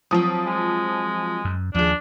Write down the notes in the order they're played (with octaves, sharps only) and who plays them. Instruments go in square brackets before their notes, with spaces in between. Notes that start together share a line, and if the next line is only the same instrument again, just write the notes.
[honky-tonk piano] F3 D#6 [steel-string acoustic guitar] F#3 C4
[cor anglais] G#3
[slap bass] F#2
[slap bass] D#2 [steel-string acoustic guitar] F3 G#4 [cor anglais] D4